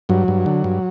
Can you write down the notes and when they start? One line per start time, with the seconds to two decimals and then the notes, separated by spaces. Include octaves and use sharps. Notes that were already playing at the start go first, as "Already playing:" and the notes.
0.09 G2 F#3
0.28 G2
0.46 D3
0.64 G2